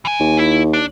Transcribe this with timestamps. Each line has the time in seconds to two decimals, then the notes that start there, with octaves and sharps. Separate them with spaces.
0.05 E3 G#5
0.20 D#2
0.38 E4
0.73 D4